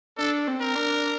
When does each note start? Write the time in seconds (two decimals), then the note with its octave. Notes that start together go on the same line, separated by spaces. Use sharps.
0.18 D4 A4
0.47 C4
0.61 A#4
0.75 D4